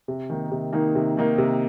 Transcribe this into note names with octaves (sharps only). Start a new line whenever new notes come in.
C3
D#3 A#3 D#4
C3
D#3 A#3 D#4
C3
D#3 A#3 D#4
C3